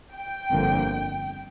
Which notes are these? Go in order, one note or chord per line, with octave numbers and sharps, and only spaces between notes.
G5
G1 F2 D3 A#3